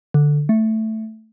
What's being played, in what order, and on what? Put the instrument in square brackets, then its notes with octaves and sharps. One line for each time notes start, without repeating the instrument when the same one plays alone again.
[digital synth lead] D3
A3